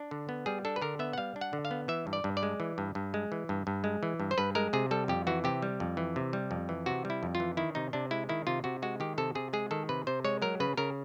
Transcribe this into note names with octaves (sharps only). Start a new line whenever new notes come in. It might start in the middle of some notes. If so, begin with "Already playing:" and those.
Already playing: D4
D3
B3
G3 G#4
D4 A4
B4
D3 A#4
B3 E5
F#5
G3 F5
D4
F#5
D3
F5
B3
E3 E5
G2
D5
G2
D5
G#3
E3
G2
G2
G#3
E3
G2
G2
G#3
E3
G2
C5
G2 B4
G#3 A#4
C3 G#4
G3 A4
F2 G4
E3 F#4
C3 G4
G3
F2
E3
C3
G3
F2
E3
C3 F#4
G3
E4
F2
F4
E3
D#3 E4
C3 D#4
C3 D4
G#3 E4
D#3 E4
C3 F4
C3 F#4
G#3 F#4
D#3 G4
C3 A4
C3 G#4
G#3 G#4
D#3 A4
C3 B4
C3 C5
G#3 C#5
F#3 A#4
C#3 B4
C#3 A#4